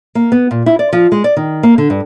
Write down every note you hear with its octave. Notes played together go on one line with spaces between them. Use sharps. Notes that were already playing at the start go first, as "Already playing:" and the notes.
A#3
B3
A#2
E4
D5
F3
G#3
D5
D#3
A#3
D3
G2